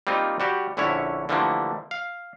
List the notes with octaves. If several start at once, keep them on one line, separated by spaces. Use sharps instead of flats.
G3 A#3 C4 D#4 F4
G3 F#4 G4
A#1 D3 C#4 E4 C#5
D3 E3 F3 G3 A3 A#3
F5